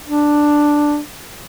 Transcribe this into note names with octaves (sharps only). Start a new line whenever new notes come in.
D4